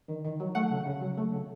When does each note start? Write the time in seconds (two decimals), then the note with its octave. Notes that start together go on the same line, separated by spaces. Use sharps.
0.08 D#3
0.25 D#3
0.40 F#3
0.55 A3 F#5
0.70 C#3
0.86 C#3
1.01 F#3
1.17 A3
1.32 C#3